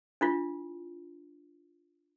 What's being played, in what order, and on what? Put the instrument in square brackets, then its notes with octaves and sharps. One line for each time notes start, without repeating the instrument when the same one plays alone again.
[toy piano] D4 E4 F4